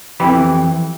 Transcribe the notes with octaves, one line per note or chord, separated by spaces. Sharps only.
F2 E3 G4 B5